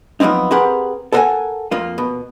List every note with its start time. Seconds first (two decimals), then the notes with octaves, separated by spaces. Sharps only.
0.20 F3 F#3 B3 C4 D#4
0.51 C4 G4 G#4 A#4 B4 F#5
1.12 A4 A#4 C5 F5 F#5 G#5
1.71 F2 A#3 F4
1.98 B2